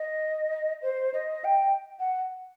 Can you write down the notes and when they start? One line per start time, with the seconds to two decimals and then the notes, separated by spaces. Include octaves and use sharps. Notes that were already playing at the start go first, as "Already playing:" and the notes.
Already playing: D#5
0.82 C5
1.14 D#5
1.44 G5
1.99 F#5